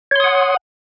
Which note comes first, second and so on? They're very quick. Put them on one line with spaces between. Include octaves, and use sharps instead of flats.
C#5 C6 D#6 F#5